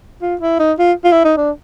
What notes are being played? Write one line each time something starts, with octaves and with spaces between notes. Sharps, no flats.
F4
E4
D#4
F4
F4
E4
D#4
D4